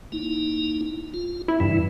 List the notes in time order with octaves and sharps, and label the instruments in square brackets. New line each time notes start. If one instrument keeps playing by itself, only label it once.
[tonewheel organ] A#3 D#4 E4
F4
[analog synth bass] E4
[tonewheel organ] E2 C#3 E3 [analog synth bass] G2